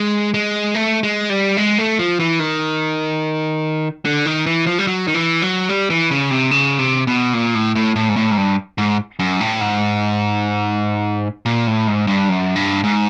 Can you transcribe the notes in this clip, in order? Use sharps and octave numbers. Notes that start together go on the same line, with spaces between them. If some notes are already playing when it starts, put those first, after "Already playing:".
Already playing: G#3
G#3
A3
G#3
G3
G#3
A3
F3
E3
D#3
D3
D#3
E3
F3
G3
F#3
D#3
E3
F#3
G3
E3
C#3
C3
C#3
C3
B2
A#2
A2
A2
A2
G#2
A2
G#2
G2
G#2
F#2
A2
G#2
A#2
A2
G#2
G2
F#2
G2
G#2